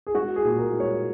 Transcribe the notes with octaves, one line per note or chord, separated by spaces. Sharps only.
G#4
G#3 F#4
G#4
A#2
A#4
G#3
C#5